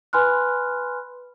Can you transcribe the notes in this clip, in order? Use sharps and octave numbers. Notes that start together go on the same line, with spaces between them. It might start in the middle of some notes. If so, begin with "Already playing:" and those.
B4 G#5 B5 C6 F6 F#6